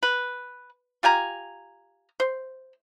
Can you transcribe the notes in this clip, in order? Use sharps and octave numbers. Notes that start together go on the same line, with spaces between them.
B4
F4 G4 G#5 A#5
C5